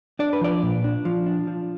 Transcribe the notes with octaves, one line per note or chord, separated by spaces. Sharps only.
D4 D5
B4
F3 D5
A#2
D4
F3
D4
F3